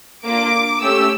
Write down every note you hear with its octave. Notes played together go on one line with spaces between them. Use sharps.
A#3 D4 F4 D6
A3 C#4 G4 E6